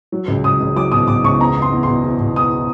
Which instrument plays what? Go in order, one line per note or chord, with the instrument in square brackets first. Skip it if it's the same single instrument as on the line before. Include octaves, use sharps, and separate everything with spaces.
[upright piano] F#3
C#2
C#2 D#6
C#2
F#3 D6
B2 D#6
B2 D6
C#2 C#6
E2 A#5
E2
C6
E2
B2 C6
E2
B2
E2 D#6